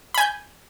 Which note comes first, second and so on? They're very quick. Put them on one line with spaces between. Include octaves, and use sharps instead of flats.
B5 G#5 G6